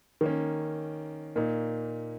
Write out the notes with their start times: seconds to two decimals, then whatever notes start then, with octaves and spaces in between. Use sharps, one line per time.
0.21 D#3 A#3 C#4
1.36 A#2 A#3 D#4